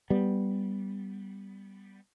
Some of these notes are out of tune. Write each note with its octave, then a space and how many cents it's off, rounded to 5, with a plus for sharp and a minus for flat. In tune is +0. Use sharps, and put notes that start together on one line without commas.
G3 +0 B3 +0